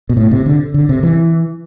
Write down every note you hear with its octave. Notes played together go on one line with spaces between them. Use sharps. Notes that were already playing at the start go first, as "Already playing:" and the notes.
B2
A2
C3
D3
D3
C3
E3